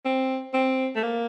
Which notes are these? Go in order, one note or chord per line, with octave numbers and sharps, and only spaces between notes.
C4
C4
A3
A#3